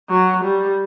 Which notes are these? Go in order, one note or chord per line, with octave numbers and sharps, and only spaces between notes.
F#3
G3